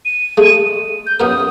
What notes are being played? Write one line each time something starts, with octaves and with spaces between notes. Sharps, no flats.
D#7
G#3 A3
G6
F#2 B3 A#4 D#6